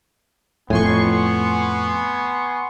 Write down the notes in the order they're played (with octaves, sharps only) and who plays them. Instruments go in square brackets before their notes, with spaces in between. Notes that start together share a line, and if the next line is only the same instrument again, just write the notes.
[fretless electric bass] F2 A2 [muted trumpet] B3 [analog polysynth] G#5 C6 C#6